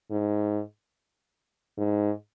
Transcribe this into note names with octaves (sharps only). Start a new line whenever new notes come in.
G#2
G#2